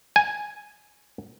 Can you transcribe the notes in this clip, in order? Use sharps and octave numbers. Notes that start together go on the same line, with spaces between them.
G#5